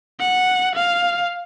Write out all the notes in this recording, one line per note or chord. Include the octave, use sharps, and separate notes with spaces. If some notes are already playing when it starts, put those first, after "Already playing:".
F#5
F5